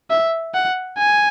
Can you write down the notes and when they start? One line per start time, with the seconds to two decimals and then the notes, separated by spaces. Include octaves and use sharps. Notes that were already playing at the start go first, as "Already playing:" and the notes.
0.10 E5
0.54 F#5
0.98 G#5